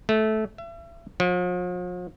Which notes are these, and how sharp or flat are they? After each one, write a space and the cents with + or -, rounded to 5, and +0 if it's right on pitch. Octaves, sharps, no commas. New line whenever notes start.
A3 -15
E5 +40
F3 +45